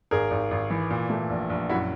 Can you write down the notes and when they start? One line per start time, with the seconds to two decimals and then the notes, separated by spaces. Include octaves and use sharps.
0.11 G#1 G#4 A#4
0.31 G#1
0.51 G#1
0.70 E3
0.90 A#2
1.10 A3
1.30 A#1
1.50 A#1
1.69 F#2 E4 F#4